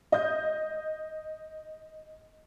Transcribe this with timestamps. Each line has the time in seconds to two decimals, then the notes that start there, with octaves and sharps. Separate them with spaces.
0.12 D#5 G6